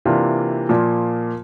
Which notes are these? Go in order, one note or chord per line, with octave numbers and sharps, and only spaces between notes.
C3 E3 A#3 D4 F4
A#2 F3 A#3 F4